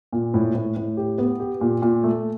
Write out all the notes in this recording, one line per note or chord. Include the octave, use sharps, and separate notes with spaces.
A#2
A2
A2
A2
G4
B3
G4
A#2
A#2
A3